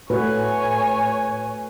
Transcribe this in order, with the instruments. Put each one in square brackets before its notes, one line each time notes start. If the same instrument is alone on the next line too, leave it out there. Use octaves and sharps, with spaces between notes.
[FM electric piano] A2 [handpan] A3 F#4 B4 [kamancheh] C#5 G#5